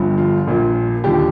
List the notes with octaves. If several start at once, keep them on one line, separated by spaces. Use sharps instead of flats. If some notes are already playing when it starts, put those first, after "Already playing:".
Already playing: G1 G2 F3
F4
A#1 A#2 F3
D#2 D3 F3 G4